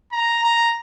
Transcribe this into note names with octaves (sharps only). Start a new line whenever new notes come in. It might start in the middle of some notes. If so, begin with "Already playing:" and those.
A#5
A#5